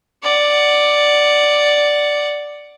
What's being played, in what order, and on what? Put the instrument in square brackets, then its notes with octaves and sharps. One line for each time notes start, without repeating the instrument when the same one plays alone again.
[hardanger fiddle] D5 F#5